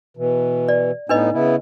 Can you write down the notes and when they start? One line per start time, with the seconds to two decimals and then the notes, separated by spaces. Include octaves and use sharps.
0.17 B2 E3
0.69 D5
1.09 A2 B3 D4 D#4 B4 D#5
1.33 C#3 B3 E4